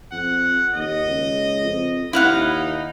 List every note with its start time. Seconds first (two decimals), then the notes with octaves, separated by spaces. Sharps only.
0.12 F2 F#5
0.74 D#2 D#5
1.07 C#2
1.65 F2
2.13 D#2 D#4 E4 F5 F#5